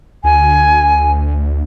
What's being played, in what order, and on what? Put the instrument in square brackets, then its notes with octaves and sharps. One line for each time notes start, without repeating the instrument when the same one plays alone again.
[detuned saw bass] D2 [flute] G#5